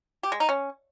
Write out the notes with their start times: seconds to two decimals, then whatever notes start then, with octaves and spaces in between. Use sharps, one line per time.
0.23 G4
0.32 G#3
0.40 D#4
0.49 C#4